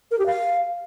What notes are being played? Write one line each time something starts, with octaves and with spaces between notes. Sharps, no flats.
A#4
G4
F5